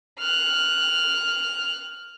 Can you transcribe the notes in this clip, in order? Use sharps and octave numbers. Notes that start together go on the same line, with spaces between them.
F6 F#6